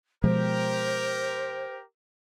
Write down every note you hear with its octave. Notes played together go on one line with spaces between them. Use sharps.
B2 F3 G#3 G4 A#4 C5